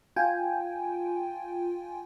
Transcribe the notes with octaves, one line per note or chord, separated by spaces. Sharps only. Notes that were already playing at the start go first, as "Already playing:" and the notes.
F4 G5 G#5